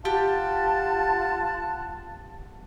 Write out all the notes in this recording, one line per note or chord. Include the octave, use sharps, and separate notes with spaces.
F4 G4 F#5 A5